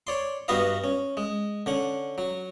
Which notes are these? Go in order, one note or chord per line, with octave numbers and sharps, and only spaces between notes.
C#5 D5 C6
G2 B3 F#4 B4 D#5 F5
C#4
G#3
D3 C#4 F#5
F#3